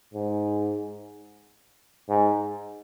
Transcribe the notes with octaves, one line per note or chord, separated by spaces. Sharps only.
G#2
G#2